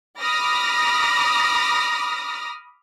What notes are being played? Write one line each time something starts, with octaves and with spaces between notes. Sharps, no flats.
B5 D6 D#6 F6 A#6